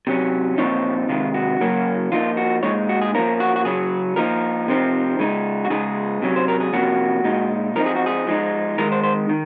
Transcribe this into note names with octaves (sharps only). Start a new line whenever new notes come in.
C3 F#3 C#4
A#2 F3 C4 D#4 C#5
C3 D#3 G#3 F4
F#4
C#3 F#3 A#3 C#4
F3 A#3 D#4 F4
F#4
A#2 G#3 D#4 C#5
F#4
G#4
F3 A#3 C#4 A#4
F#4
F#4
C#3 F#3 C#4 G#4
F3 A#3 D#4 A#4
C3 F3 C4 D#4
C#3 G#3 D#4
F#4
C#3 G#3 D#4 G#4
C3 F#3 C#4
C5
A#4
G#4
C3 F3 A#3 C#4 F#4
A#2 G#3 D#4
F3 C4 D#4 A#4
G#4
F#4
G#4
F3 G#3 D#4
D#3 G#3 D#4 A#4
C5
C5
D#3